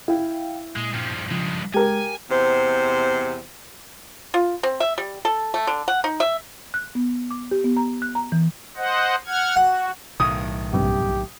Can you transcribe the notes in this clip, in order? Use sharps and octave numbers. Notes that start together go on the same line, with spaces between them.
E4 F5 G5
A#2 G#3
G2 F3
G2 C#3 F3 G#3
G#3 G4 A#4 G#5
E2 C3 C5
F4
C4
E5
G3
A4
A3
D3
F#5
D#4
E5
F#6
B3
D6
G4
B3
A#5
F#6
A#5
E3
C5 D#5 F#5
F#5 F6 G#6
F#4 F#5
B1 A2 D#3 D#6
A#1 G2 C3 G4